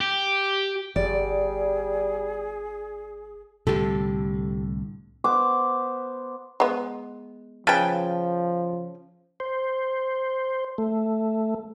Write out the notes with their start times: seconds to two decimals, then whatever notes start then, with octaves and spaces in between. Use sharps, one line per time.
0.01 G4
0.96 G1 G3 G#4 D5
3.67 C2 A2 D3 G4 A4
5.24 B3 C5 D6
6.60 G#3 B3
7.67 C#3 F3 B4 G5 A5
9.40 C5
10.78 A3